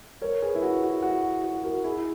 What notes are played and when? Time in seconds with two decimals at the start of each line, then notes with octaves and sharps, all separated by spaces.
0.22 A#4 C#5
0.42 G#4 B4
0.55 E4
0.63 F#4
0.83 F#4
1.03 F#4
1.44 F#4
1.64 F#4 A#4
1.84 E4 G#4